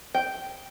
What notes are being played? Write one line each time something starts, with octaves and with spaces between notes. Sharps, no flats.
G5